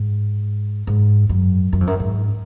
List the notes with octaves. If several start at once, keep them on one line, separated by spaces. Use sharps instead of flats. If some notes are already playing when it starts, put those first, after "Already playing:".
Already playing: G#2
G#2
F#2
F#2
F2
F#2
G#2